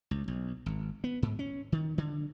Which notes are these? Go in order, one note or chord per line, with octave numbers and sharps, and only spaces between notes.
C#2
B1
G#1
B3
G#2
C#4
D#3
D3